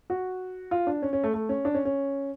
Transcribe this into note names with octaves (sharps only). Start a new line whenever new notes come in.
F#4
F4
D4
C#4
C#4
A3
A3
C#4
D4
C#4
C#4